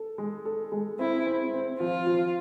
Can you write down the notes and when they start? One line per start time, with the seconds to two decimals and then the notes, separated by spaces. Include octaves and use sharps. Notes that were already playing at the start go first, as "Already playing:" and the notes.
Already playing: A4
0.18 G#3
0.45 A4
0.72 G#3
0.99 C4 E4
1.26 C4
1.53 C4
1.80 F3 F4
2.07 F3